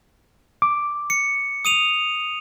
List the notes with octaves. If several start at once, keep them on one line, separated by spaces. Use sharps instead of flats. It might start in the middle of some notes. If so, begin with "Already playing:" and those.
D6
C#7
D#6 D#7 F7